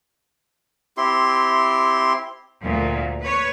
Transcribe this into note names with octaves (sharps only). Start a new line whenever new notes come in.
C4 E4 G4 C6
D2 A#2
B4 C#5